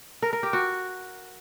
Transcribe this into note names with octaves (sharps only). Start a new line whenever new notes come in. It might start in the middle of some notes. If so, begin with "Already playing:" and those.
A#4
A#4
G4
F#4